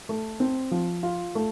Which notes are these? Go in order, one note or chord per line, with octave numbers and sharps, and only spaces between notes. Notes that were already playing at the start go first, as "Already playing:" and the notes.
A3
C4
F3
F4
A3